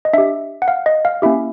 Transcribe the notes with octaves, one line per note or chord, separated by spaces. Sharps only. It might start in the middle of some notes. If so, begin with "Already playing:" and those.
D#5
D4 G4 E5
F#5
F5
D#5
F5
A#3 C#4 E4 G4 E5